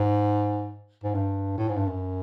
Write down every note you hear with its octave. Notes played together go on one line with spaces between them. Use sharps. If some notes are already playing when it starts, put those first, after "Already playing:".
Already playing: G#2
G#2
G2
A2
G#2
G2
F#2